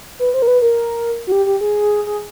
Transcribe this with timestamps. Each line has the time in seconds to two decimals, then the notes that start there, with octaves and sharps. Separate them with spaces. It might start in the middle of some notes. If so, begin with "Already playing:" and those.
0.19 B4
0.34 C5
0.42 A#4
0.47 B4
0.62 A#4
1.27 F#4
1.32 G4
1.46 G4
1.61 G#4
2.06 G#4